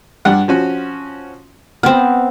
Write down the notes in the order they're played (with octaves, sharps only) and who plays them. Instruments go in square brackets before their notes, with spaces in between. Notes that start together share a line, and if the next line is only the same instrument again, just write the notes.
[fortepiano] G2 D4 F#5
F3 C#4 F#4
[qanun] B3 C4 [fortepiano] F6